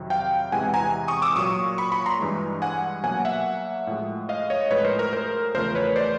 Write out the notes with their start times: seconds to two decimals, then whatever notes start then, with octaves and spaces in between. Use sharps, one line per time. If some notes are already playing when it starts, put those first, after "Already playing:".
Already playing: F2 C3 D#3 F#3
0.10 F5 G5
0.52 E2 C3 E3 G#3 F#5 G#5
0.74 G#5 A#5
1.08 C#6 D#6
1.22 D6 E6
1.36 A#2 F#3 A#3 C#6 D#6
1.78 B5 C#6
1.92 B5 C#6
2.06 A#5 C6
2.20 G2 E3 G#3
2.62 F#5 G#5
3.03 B2 F#3 A#3 F#5 G#5
3.25 E5 F#5
3.87 A2 F3 G#3
4.29 D#5 F5
4.50 C#5 D#5
4.71 A2 F3 G#3 B4 C#5
4.84 A#4 C5
4.99 A#4
5.13 A#4 C5
5.55 E2 C#3 F3 A3 A#4 C5
5.75 B4 C#5
5.96 C5 D5